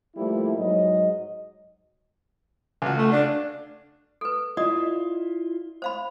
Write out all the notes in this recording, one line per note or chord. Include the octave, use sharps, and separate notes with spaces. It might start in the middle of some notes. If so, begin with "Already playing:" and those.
F3 G3 A3 A#3 E4
G#2 F#3 D#5
C#2 F#4
A3
D4
A4 B4
E4 F4 D5 D#5 D#6
C5 F5 B5